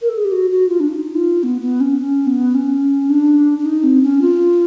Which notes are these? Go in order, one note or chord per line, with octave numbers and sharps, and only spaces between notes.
A#4
A4
G#4
G4
F#4
F#4
F4
D4
D#4
F4
B3
B3
C#4
C#4
B3
C#4
D4
D4
D#4
C4
C#4
F4